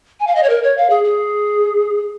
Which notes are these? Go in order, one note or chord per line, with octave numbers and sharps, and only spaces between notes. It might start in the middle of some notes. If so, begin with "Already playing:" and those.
G#5
F5
D#5
C#5
A#4
C#5
F5
G#4
G#4